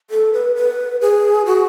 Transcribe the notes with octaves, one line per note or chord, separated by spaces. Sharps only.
A4
B4
B4
G#4
F#4